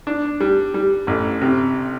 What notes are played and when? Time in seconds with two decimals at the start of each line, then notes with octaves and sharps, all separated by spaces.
0.07 D4
0.40 G3
0.74 G3
1.07 A1
1.42 C3